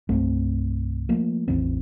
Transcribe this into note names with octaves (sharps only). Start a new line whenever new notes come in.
C2 G2 A3 C4
F3 A3 A#3
A1 E2 E3 C4